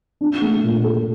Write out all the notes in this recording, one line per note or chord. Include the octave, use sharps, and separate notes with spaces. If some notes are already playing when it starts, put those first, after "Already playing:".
D4
A3
A#2
A4